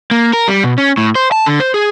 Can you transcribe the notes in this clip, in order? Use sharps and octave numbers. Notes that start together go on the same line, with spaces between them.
A#3
A#4
G3
B2
C#4
A2
C5
A5
D3
C5
G#4